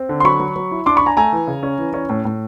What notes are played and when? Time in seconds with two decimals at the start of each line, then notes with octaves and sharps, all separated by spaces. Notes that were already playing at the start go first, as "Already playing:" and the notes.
Already playing: C4
0.09 D3
0.20 C6
0.24 F#3 B5 C#6
0.40 F#3
0.56 F#3
0.71 E4
0.86 D4 C6 D6
0.96 B5 C#6
1.01 D4
1.06 G#5 A#5
1.17 A3 G#5 A#5
1.32 E3
1.47 C#3
1.63 C#4
1.79 E3
1.94 C#4
2.10 A2
2.25 A2